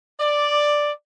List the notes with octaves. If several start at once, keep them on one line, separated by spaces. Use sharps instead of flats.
D5